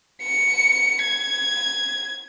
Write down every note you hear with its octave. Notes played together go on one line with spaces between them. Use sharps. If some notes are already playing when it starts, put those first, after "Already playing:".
C#7
G#6